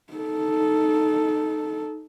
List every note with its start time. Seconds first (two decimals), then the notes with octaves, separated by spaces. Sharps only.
0.13 D#4 A4